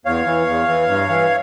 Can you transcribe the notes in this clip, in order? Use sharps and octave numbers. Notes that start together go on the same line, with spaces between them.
E2 C#5 F5
E3
E2
E3
G2
E3